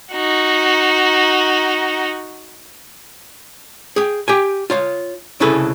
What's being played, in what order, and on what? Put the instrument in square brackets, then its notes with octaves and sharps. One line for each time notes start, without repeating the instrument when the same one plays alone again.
[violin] D#4 F#4
[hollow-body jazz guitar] G#4 G5
G4 G5 G#5
F4 C#5 F5
C2 C#3 E4 G#4 A4 B4